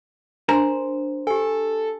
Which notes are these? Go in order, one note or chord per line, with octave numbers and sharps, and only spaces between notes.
D4 A#4 C5 A#5 C6
G4 A4 G#5